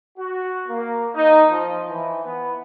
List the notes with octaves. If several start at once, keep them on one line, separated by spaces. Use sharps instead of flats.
F#4
A#3
D#4
F3
E3
B3